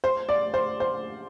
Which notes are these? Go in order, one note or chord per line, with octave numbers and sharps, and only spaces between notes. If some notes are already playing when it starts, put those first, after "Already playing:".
C5
D5
C5
C5